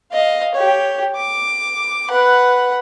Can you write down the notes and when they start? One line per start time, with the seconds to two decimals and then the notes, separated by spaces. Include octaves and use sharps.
0.12 D#5 F5
0.54 G4 C#5
1.16 D6
2.09 B4 F#5